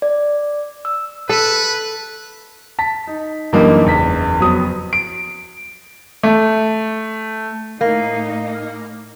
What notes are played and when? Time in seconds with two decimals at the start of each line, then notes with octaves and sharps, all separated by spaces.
0.02 D5
0.85 E6
1.29 A4 B4
2.79 A5 B6
3.07 D#4
3.53 F#2 D3 E3 G3 A#3 D#4
3.84 F#1 E2 B6
4.40 F2 F#3 B3 D#6
4.93 D7
6.23 A3
7.81 A2 A#3 D#4